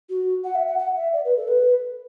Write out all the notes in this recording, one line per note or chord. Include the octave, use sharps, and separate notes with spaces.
F#4
F#5
E5
F#5
F#5
E5
D5
B4
A4
B4